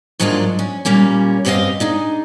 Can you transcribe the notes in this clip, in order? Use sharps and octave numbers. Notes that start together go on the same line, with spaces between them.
G#2 F#3 G#3 A#3 D4 F4
C#4
A#2 G3 A#3 C#4
G2 C#3 C4 F4 D#5 F5
D4 D#4 G#4